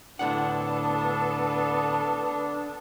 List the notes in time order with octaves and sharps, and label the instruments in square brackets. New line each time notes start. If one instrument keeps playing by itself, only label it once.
[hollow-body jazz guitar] D2 A2 F#5 [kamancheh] B3 A4 [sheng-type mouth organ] D4